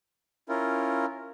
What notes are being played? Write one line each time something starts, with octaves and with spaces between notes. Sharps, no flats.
C#4 E4 F4 A#4